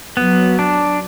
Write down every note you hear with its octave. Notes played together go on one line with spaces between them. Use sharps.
F#3 B3
D4